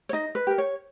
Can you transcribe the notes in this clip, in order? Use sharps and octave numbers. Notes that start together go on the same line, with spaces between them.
C#5
D#4 D#5
B4
G4 A#4
C#5